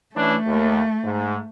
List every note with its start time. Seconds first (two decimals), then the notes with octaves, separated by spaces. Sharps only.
0.16 E3 A3 C#4 D4
0.46 D#2
1.04 G#2